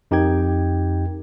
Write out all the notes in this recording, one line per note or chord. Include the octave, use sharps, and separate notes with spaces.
F2 D#4 G4 A#4 G5 G#6